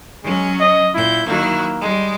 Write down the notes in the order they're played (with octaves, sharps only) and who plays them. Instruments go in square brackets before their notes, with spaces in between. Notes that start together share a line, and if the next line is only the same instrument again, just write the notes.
[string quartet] F#3 C#4 [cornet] G#3
[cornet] D#5
[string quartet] A#2 G6 [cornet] E4
[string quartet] D#3 F#3 E4 [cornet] A#3
[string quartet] G3 G#3